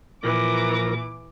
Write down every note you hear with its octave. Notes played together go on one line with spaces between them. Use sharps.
A#2 E3 F3 A#4 D6 A#6